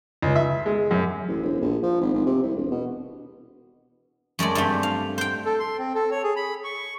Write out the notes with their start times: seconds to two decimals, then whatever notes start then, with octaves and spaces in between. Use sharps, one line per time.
0.22 C#2
0.36 E5
0.66 G#3
0.91 F#2
1.28 A1
1.43 E1
1.61 A#1
1.83 F3
2.01 G#1
2.14 G#1
2.26 C3
2.42 C2
2.56 E1
2.71 B2
4.39 F#2 G#3 A3 D5
4.55 G2 A3 C4
4.83 F5
5.18 C5 G5
5.46 A4
5.59 C6
5.78 C4
5.95 A4
6.11 C#5
6.24 G#4
6.36 B5
6.64 C#6